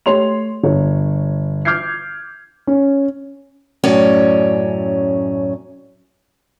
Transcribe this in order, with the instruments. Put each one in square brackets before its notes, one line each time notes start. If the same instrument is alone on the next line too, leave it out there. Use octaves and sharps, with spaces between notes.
[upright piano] A3 G4 C#5 C6 F7
G1 C#5
D6 F6 G6 G#6 C7
[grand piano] C#4
[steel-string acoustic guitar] F#2 A2 C#4 C#5 D5